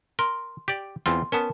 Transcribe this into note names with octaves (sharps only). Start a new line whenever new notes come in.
A#4 C6
G4 D5
E2 C4 F4 C6
B3 C#4 A#4 A5